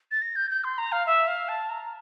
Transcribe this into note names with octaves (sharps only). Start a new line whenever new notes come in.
A6
A#6
G6
G6
C6
A#5
F5
E5
F5
A5
A#5